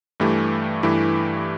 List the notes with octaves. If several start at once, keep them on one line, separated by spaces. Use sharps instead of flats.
G2 E3 A3 E4 G4
G2 E3 A3 E4 G4